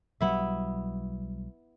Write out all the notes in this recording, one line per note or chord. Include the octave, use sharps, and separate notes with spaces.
B1 F#3 G3 B3 E4 E5